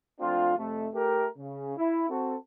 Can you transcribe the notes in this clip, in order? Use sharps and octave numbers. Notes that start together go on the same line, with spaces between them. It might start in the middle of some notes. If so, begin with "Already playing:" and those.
F3 A3 C4 D4 F4
F2 C3 A3
A3 G4 A#4
C#3
E4
C4 F#4 A4